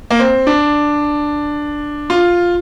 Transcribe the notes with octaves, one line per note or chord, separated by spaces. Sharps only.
A#3
C4
D4
F4